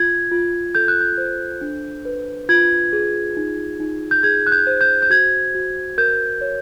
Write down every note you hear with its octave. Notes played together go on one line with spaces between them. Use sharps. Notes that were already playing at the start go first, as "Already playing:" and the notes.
Already playing: F4 G#6
F4
A4 G6
F#6
G6
C5
D4
B4
F4 G#6
G#4
D#4
D#4
G6
G#4 G#6
F#6
G6
C5
G6
G6
F#4 G#6
F#4
A#4 G6
C#5